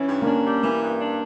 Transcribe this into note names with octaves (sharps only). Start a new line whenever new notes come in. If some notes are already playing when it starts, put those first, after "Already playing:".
Already playing: E3 C#4
G2
A#3
C#4 D4
G3
E3 A#3
G2
D4